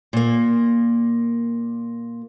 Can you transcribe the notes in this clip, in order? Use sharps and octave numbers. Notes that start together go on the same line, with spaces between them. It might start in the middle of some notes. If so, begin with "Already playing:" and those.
A#2 A#3